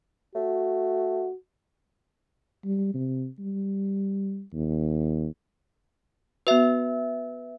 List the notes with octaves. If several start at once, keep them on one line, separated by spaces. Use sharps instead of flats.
A3 F#4
G3
C3
G3
D#2
B3 F#4 B4 E5